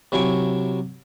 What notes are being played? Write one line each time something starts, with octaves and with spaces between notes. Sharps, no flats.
C3 F#3 E4 G#5 C#6 D6